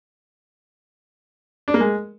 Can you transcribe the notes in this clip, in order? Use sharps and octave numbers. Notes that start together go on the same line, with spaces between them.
D4
A#3
G#3